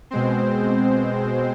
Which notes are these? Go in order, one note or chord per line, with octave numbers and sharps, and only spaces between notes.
B2 G#3 C4 C5